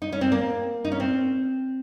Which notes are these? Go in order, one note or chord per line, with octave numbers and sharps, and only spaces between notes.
D#4
C#4
C4
A#3
D#4
C#4
C4